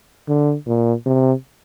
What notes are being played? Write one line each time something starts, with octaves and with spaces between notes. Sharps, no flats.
D3
A#2
C3